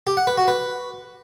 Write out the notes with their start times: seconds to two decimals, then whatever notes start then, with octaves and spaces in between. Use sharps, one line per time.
0.07 G4
0.17 F#5
0.27 B4
0.37 F#4
0.48 B4